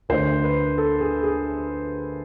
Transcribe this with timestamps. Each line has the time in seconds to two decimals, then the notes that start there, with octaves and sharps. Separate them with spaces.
0.09 D2 D3 A3 C5
0.44 B4
0.78 A4
1.01 G#4
1.23 G#4